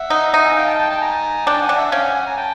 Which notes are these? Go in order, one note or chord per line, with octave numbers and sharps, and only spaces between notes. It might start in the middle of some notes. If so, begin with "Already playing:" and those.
Already playing: E5 F#5
D#4
D#4
G#5
F5 G5
G5 A5
G5 A5
G5 A5
G#5 A#5
D4 G5 A5
F#5 G#5
D4
E5 F#5
C#4 F5 G5
F#5 G#5
F#5 G#5
G#5 A#5
G5 A5